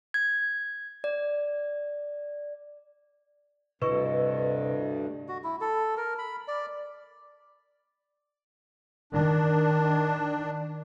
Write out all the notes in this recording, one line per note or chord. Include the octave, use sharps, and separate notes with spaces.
G#6
D5
D2 G2 C3 E4 A4 B4 D#5 C#6
F#4
E4
A4
A#4
B5
D5
D#3 D4